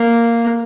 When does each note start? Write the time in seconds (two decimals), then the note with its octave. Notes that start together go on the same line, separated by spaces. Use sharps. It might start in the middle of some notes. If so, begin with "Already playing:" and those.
Already playing: A#3